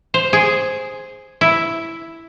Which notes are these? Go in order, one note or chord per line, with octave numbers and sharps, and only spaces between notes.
C5
G#4
E4